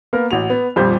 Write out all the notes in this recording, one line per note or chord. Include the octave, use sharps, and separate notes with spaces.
A#3 B3 A#4
A1 F#4 F7
B3
D#1 F2 G3 C5 G6